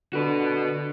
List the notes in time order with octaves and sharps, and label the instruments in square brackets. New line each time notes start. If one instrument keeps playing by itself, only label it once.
[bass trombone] D3 [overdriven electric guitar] F#4 B4